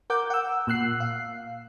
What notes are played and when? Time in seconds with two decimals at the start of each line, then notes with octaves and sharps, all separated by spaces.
0.10 A#4 F#5 D6 G6
0.30 F#5 E6
0.67 A#2 E6 F#6 C7
1.00 F5